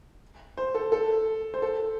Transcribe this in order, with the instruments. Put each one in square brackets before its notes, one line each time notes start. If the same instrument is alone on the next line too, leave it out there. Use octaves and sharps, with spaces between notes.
[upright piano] C5
A4
A4
C5
A4